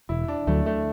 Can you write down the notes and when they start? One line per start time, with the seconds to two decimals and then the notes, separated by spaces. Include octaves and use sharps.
0.09 E1 E4
0.28 D4
0.47 D2 D3 F#3 A3
0.66 A3